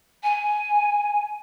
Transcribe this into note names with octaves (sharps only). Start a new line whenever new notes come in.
G#5